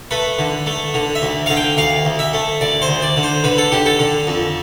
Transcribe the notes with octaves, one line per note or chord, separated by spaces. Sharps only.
A3 B4
D3
A3
D3
E5
D2
D3 F5
G5
D2 F5
D2
E5
A3
D2 D5
C5
D2
D5
D3
C5
D3 B4
A4
D3 G4
A4
D3
F2